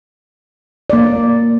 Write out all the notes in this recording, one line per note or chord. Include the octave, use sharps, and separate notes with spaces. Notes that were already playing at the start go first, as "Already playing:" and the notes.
A#3 D5